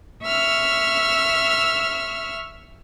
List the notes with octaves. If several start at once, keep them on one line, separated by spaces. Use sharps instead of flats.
E5 C#6 E6 F6